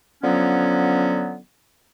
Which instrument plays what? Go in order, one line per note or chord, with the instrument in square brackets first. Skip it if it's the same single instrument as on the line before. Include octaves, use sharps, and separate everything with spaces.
[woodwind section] D3 F3 F#3 B3 C#4